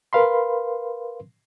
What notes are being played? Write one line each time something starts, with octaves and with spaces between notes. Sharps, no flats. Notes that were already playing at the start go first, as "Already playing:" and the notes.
A#4 B4 F5 B5 C6